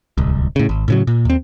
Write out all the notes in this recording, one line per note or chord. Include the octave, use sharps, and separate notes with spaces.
D1 C2
A2 C#3
G#1
A2 C#3 F#3
A#2
D#2 C4